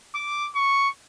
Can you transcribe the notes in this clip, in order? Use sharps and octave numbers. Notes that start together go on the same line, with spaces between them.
D6
C#6